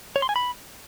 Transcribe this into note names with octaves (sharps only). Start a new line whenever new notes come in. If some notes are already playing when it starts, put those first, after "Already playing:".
C#5
C6
G#5
B5